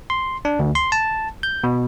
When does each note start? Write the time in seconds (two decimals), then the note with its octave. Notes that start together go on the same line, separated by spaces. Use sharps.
0.10 C6
0.45 D4
0.59 D2
0.75 C6
0.92 A5
1.43 G6
1.64 B2